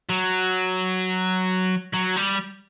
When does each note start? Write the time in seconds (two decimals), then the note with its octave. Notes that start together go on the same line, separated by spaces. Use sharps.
0.10 F#3
1.94 F#3
2.17 G3